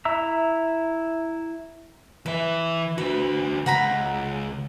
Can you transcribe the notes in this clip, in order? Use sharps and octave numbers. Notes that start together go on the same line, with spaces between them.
E4 E5 A#5 E6
E3 B4 E5
D3 F#4 B4
C#2 F#5 A#5 B5